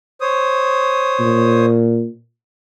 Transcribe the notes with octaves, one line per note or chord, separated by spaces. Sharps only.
C5 C#5 D#6
A#2